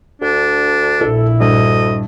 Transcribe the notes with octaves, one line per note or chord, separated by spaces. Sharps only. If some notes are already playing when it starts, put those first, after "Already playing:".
D2 D4
A#1 E4 A4
D2 G2 D#5